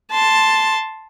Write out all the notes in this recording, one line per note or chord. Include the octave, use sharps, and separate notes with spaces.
A5 C6